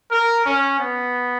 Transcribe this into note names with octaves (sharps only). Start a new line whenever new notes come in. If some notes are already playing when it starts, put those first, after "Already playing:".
A#4
C#4
B3